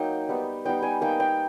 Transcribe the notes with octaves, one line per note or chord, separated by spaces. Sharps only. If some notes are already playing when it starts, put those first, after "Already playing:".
Already playing: F#3 A#3 D#4 G5
G3 B3 D#4
G3 B3 D#4 G5
G#5
A#3 D#4 G5
G5